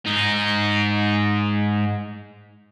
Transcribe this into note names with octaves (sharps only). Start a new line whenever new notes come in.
G#2 D#4